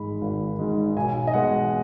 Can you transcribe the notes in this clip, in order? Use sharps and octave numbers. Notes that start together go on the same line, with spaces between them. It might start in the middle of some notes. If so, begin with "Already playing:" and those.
Already playing: G#1 G#2 G#3 B5
G#1
G#2 G#3
B1 G#5
D#5
B2 G#3 F#5